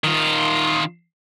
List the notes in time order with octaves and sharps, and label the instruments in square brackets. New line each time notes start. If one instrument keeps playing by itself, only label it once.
[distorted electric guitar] D#3 F4